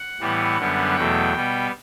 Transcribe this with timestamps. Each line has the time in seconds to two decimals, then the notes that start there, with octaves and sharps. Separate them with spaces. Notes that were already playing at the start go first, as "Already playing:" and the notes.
Already playing: F#5
0.20 A2 E3 G3 B3
0.58 F#2 D3 G3 B3
0.96 E2 B2 F#3 A3 G5
1.34 B2 G3 B3